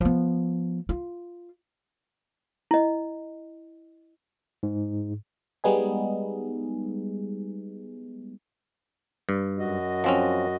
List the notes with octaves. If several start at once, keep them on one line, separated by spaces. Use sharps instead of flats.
F3 B3
F4
E4 D#5
G#2
G3 G#3 B3 D#4 G#4
G2
F#2 F#4 D#5
F3 C4 C#4